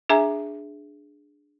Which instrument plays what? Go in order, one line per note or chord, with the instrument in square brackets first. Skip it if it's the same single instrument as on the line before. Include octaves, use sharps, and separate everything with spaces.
[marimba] D4 G#4 E5 G#5 A#5